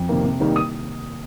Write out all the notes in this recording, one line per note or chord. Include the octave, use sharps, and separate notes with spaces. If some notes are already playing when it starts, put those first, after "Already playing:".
Already playing: F2
C3 D#3 A#3
C3
D#3 G3 A#3 D#4
D#6